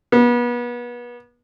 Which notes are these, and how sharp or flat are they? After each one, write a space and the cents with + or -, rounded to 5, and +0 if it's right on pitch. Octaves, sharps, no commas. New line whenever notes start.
B3 -35